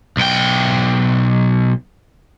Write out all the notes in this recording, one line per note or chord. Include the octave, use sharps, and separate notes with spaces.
B1 G5